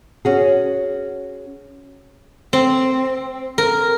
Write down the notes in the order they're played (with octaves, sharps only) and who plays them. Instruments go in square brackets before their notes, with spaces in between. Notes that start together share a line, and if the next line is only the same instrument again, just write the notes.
[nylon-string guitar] C#4 F#4 G#4
[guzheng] C4
A#4